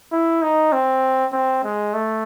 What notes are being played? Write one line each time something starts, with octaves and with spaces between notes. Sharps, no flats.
E4
D#4
C4
C4
G#3
A3